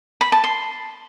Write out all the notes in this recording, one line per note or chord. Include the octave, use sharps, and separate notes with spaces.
B5
A5
C6